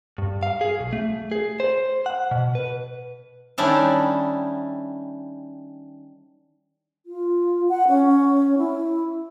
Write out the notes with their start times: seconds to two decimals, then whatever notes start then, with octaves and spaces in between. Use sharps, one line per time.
0.18 G2
0.43 F5
0.61 G#4
0.79 B1
0.93 A3
1.32 G#4
1.60 C5
2.06 F#5
2.31 B2
2.55 B4
3.58 D#3 G3 C#4 D4 E4
7.06 F4
7.69 F#5
7.88 C#4
8.58 E4